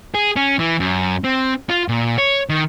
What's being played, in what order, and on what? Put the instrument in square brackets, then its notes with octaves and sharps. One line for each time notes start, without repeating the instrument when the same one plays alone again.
[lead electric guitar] G#4
C#4
E3
F#2
C4
F4
A#2
C#5
D#3